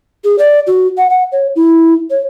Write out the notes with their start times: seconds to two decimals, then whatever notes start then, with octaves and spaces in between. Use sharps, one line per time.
0.24 G#4
0.38 D5
0.67 F#4
0.97 F#5
1.10 F#5
1.32 C#5
1.56 E4
2.10 C#5